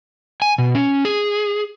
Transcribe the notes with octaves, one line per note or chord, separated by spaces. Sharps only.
G#5
B2
C#4
G#4